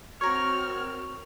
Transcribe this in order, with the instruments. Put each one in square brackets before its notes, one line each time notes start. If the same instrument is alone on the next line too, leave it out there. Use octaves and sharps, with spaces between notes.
[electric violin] C4 F6 [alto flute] F#4 [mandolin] A#4 C#5 [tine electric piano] C#6